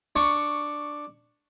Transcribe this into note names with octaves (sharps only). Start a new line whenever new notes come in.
D4 C#6